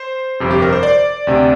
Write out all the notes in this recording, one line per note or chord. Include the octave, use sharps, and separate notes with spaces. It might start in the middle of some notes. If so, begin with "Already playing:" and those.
Already playing: C5
G1 F2 C3
G4
A#4
C5
D5
D2 C3